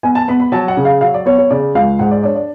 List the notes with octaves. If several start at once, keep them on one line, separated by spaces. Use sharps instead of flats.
B3 G#5
A5
B3 B5
B5
F#3 A5
F#5
C#3
F5
F#3 F5
D5
B3 C#5
C#5
C#3 D5
C#2 F5
G#2 F#5
D5
D4 C#5
D5